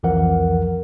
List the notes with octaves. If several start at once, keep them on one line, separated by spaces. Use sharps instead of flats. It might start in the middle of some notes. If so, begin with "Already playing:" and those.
C2 F2 E3 F3 A#4 F#5